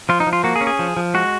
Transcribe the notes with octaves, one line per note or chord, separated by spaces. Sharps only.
F3 F4
D#4
F3
F4
A#3 F#4
G#4
C#4
G#4
F3
F3
G#3 F#4